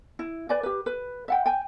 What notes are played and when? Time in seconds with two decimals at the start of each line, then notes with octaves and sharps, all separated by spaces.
0.19 E4
0.49 B4 D5 G#5
0.63 G4 B4
0.86 B4
1.28 E5 F#5 G5
1.46 G5 G#5